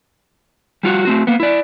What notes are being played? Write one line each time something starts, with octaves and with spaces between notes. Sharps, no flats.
G3 F4 F#4
A3 C4 F#4
A#3 B3
E4 D5